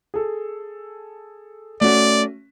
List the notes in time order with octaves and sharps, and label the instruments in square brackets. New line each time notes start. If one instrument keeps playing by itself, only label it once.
[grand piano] G#4 A4
[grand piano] A3 C#4 F#4 [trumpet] D5